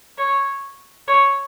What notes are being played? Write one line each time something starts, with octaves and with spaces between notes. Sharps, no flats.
C#5
C#5